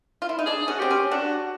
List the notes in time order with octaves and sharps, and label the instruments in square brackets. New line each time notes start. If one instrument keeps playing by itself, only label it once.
[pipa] F4
E4
D#4
[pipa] D4 [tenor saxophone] G#4
[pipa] C#4 [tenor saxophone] F#4
[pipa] C4 [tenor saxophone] G4
[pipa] C#4
[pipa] D4 [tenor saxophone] F#4